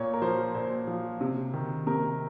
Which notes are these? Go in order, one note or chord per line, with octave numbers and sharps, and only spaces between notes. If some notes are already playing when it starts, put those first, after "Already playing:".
Already playing: A#2 C#5
A#4
F3 C5
A#2 C5
F3
C3
D#3
C3 A#4